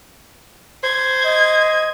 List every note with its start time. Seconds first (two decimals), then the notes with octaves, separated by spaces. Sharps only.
0.84 C5 G#6
1.25 D#5